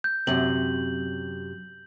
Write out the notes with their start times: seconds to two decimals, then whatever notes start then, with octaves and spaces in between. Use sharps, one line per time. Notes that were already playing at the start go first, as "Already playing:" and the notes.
0.04 G6
0.27 F#2 C3 F#7